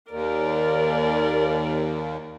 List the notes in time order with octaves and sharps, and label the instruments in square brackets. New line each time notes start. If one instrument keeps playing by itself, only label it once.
[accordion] D#2 [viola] A#4 D5